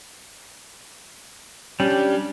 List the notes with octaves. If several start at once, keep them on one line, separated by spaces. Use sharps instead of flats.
G3 C#4 D4